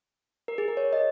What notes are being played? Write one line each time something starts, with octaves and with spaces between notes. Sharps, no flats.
A#4
G#4
A#4
C#5
D#5